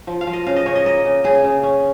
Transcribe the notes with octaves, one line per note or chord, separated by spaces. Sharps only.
F3
F5
F3
D#5
C#3 F5
D#5
C#3 C#5
D#5
A#3 D#5
C#3
C#3 G#4
C#3
C#4